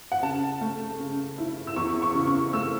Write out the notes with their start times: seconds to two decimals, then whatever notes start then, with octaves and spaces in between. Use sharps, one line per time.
0.12 F#5
0.23 C#3 A5
0.61 A3
0.99 C#3
1.38 E4
1.67 E6
1.76 E2 C#6
2.02 C#6
2.15 C#3
2.27 C#6
2.53 A3 E6